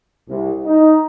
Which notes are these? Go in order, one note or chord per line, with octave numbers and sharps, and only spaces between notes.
C2
D#4